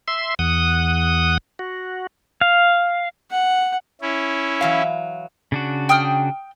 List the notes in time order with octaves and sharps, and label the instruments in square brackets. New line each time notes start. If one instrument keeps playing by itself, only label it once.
[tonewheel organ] E5 C6
E2 F#5 D#6
F#4
[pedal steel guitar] F5
[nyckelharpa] F#5
[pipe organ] C#4 E4
[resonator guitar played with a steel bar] E3 F#3 F5
[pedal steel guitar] C#3 D4 F#4
[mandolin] G5 D#6 F6